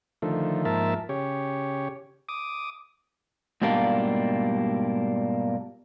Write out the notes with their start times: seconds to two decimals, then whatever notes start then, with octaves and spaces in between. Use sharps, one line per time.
0.22 D3 D#3 F3 A3
0.65 G#2 F3 A#3 A#4 E5 A5
1.09 C#3 G4 C#5
2.29 D6 D#6
3.62 G#2 B2 G3 A#3 D4 F4